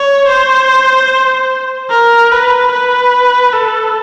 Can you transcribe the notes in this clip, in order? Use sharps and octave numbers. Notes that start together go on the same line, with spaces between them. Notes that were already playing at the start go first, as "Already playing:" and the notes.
Already playing: C#5
C5
A#4
B4
B4
A4